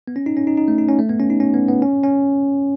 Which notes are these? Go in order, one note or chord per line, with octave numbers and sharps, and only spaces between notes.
B3
C#4
D#4
C#4
D#4
D#4
A3
D#4
C#4
A3
B3
C#4
D#4
C#4
B3
B3
C#4
C#4